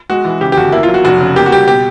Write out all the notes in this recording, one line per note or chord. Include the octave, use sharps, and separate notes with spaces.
G#3 F#4
E3
C#3 G4
G4
G1 F#4
A#3 E4
F4
F#3
F#4
F1 F#4
C#3
A#3 G4
F#4
G3 G4
B2 G4